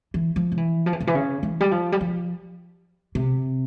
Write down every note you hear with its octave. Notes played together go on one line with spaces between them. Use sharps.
E3
F3
C#3
E3
F3
E3
C#3
E3
C#3
E3
G3
F3
G3
F3
C3